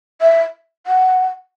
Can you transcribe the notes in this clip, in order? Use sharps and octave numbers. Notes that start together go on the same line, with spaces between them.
E5
F#5